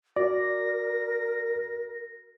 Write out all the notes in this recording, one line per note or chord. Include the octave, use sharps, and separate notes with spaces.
F#4 A#4 D5 A#6